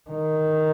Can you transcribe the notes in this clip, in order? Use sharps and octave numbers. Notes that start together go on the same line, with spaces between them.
D#3